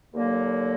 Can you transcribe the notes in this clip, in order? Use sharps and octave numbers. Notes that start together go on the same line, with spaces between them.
D#2 D3 F#3 A#3